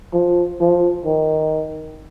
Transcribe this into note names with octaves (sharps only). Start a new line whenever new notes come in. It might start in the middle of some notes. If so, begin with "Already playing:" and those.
F3
F3
D#3